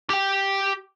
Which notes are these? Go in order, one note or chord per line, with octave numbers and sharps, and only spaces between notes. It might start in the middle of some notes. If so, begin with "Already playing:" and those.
G4 G5